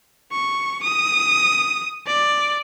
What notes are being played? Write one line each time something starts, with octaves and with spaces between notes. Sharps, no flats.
C#6
D#6
D5